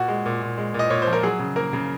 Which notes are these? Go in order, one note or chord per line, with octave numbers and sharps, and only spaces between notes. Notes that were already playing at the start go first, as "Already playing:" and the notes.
Already playing: A#2 F#4
G#3
A#2
A#2
G#3
A#2
D#5
A#2 C#5
C5
F3
A#4
F#3 G#4
C#3
A#3 A#4
C#3